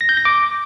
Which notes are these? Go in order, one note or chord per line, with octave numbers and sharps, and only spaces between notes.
A#6
G6
A#6
D6